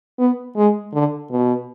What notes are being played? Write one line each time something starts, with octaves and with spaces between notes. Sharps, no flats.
B3
G#3
D3
B2